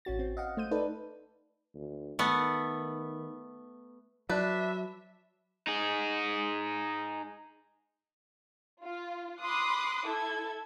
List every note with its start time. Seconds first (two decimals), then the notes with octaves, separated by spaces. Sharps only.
0.05 A1 C#4 F#4 A6
0.19 C4
0.37 D#5 F5 F#5
0.57 A3 C5 G6 D#7
0.71 D#4 A4 B4 D5
1.75 D2
2.19 D#3 A3 B3
4.29 F#3 D4 B4 E5
5.67 D#4 G#4
8.84 F4
9.41 B5 C6 D6 D#6 F#6
10.06 E4 A4 G#6